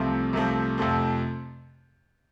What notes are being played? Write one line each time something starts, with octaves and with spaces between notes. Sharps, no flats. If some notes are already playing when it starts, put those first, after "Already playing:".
Already playing: C2 C3 F3 A3 C4
C2 C3 F3 A3 C4
F2 C3 F3 A3 C4